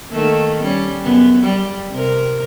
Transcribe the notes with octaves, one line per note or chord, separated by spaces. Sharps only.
D#3 A3 A#3
G3 C#4
F#2 C#3 B3
G3
C3 A#4